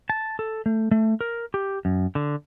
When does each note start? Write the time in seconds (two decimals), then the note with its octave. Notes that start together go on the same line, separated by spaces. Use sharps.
0.10 A5
0.39 A4
0.66 A3
0.91 A3
1.21 A#4
1.54 G4
1.85 F#2
2.15 D3